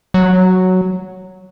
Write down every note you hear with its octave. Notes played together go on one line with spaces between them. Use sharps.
F#3